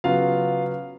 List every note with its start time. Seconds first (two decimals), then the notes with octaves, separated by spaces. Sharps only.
0.04 C#3 F#3 B3 F4 F5